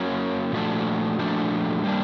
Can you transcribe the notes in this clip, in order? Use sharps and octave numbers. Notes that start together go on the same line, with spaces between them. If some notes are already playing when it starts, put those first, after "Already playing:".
Already playing: F#3 A#3 C#4
A#2 F3 A3 D4 F#4
A#2 F3 A3 D4 F#4
G3 A#3 D4